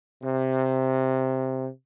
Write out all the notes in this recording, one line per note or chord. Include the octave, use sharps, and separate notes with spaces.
C3